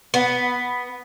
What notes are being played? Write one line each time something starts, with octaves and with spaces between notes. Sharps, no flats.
B3